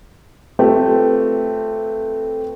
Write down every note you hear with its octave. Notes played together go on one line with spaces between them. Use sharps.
A3 C4 F4 G4 B4